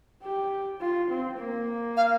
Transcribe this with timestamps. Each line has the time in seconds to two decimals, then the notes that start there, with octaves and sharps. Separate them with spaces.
0.23 G4
0.81 F4
1.10 C4
1.39 A#3
1.97 F5